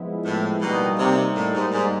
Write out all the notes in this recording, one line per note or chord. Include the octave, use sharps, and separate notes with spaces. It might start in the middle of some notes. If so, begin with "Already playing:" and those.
Already playing: F3 G#3 B3 E4
A2
B2 G3 A#3 D#4
C3
A2
G#2
G#2